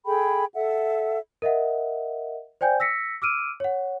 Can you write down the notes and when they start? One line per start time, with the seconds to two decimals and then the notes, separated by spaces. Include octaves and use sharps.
0.05 G#4 A4 G5 B5
0.55 A4 E5 F#5
1.42 A#4 D#5 E5 F#5
2.61 C5 D5 G5 G#5 G6
2.80 E6 A#6 B6 C#7
3.22 D6 E6 F6 D7 D#7
3.60 C#5 F#5